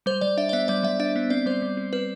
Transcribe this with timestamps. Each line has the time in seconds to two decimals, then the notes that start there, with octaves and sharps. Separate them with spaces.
0.06 G3 C5
0.21 G3 D5
0.37 D4 E5
0.49 D5
0.53 B3 E5
0.68 G3 D5
0.83 G3 E5
0.99 D4 E5
1.16 B3
1.30 C4 D5
1.46 G3 C5
1.62 G3
1.77 C4
1.93 C4 B4